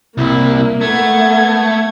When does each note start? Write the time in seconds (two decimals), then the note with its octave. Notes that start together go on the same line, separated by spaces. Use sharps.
0.18 C2 A#3 E4
0.81 A3 B3 G#6